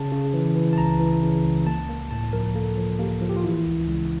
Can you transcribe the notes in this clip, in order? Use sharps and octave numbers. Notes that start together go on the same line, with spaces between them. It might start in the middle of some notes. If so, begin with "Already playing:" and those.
Already playing: C#3 A5
C#3
E3
E3
A5
C#2 A#5
E3
C#3
C#2
A#3 A5
A#3
A2 A5
F3 A#4
A#3 A4
F3
A#3 G4
F3 F4
G4
F4
E3 E4
C#2
C#2